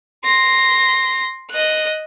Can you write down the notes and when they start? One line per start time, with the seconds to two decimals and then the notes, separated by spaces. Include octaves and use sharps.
0.24 C6 A#6
1.51 D#5 F#6